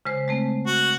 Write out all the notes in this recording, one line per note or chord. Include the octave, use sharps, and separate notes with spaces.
C#3 G#3 C5
G#3 A3 C4
F#4